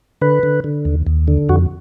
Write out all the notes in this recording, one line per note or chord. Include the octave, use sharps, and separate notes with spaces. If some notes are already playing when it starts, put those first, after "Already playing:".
D3 B4
D3
D3
D#2
D#2
D3
F2 F#4